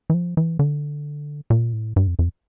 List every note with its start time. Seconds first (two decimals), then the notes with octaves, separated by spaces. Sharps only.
0.10 E3
0.14 F3
0.37 E3
0.59 D3
1.50 A#2
1.73 A2
1.96 G2
2.07 F2
2.19 F2